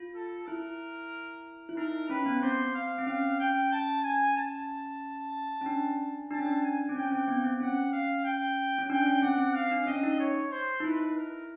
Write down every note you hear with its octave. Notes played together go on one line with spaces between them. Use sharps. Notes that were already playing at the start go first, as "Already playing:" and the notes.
Already playing: F4
A4
E4 A#4
E4
D#4 A#4
C#4 B4
B3
C4 C5
F5
C4
C#4 F5
G5
A5
G#5
A5
C#4
D4
D4 A5
C#4
D4
G#5
C4
C#4 G5
C4
B3
C4
C#4 F#5
F5
G5
C#4
D4 G5
C#4
C4 F#5
C4
C4 F5
D4
C#4 D#5
D#4
C#5
C5
D#4
E4 B4
A#4